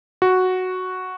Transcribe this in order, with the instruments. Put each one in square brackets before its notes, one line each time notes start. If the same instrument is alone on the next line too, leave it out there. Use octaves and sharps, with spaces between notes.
[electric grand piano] F#4